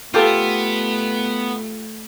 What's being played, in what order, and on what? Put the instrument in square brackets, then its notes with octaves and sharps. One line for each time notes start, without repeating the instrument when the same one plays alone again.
[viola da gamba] A3 [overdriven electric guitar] B3 [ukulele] F4 G4 A4